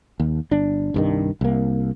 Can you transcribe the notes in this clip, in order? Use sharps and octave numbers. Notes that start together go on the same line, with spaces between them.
D#2
G1 D4
C2 G2 D#3
C2 A#3